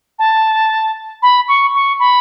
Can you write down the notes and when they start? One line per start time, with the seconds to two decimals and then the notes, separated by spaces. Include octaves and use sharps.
0.18 A5
1.22 B5
1.48 C#6
1.74 C#6
1.99 B5